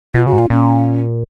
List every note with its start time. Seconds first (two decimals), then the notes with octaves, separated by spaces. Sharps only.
0.14 B2 F4
0.27 C#3 F#4
0.33 G#2
0.38 A#2 F4
0.50 A#2 C#4